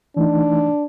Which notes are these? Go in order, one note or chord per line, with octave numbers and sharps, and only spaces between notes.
E3 A3 D4 D#4